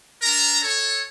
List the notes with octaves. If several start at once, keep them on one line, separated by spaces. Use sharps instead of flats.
D4 A#4 A#5
A4 C#5